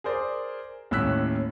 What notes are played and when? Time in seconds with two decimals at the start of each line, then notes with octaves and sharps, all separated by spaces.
0.04 G#4 A#4 C5 D5
0.91 D#2 A2 C#4 E6 F#6 B6